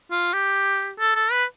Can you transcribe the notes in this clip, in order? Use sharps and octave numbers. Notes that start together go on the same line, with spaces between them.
F4
G4
A4
A4
B4